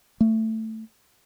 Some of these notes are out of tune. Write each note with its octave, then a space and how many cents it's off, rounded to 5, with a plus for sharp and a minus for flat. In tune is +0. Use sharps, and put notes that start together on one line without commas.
A3 +10